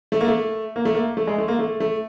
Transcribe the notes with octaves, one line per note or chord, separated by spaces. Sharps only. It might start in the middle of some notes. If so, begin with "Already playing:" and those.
A3
A#3
A3
A#3
A3
A#3
A3
G#3
A3
A#3
A3
A3